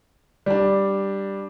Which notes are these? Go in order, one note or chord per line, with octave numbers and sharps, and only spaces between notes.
G3 D4